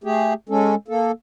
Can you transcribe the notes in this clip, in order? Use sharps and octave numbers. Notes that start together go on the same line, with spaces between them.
A3 G4 G#4
G#3 C#4 A4
A#3 A4